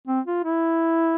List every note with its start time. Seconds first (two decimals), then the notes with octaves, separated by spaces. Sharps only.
0.07 C4
0.26 F4
0.44 E4